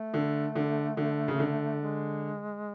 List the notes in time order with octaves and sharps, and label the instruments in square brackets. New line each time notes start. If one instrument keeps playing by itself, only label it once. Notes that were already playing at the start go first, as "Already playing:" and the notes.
Already playing: [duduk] A3
[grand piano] D3
D3
D3
C#3
D3
[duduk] G#3